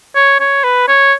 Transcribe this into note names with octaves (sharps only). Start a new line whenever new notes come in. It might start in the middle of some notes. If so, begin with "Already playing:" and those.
C#5
C#5
B4
C#5